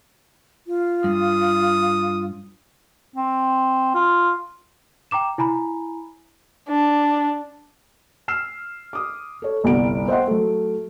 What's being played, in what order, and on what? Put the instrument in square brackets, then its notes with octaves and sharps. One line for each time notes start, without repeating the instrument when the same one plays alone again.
[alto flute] F4
[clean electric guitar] G2 [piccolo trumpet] D#6
[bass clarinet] C4
F4
[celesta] G5 A#5 D6 E7
E4 G#5 A#5 B5
[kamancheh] D4
[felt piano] E6 F6 C7 E7
D6 D#6
A4 C#5
G1 C2 F#5 D7
C5 D#5 E5 F#5 G5 C6
F#3 A3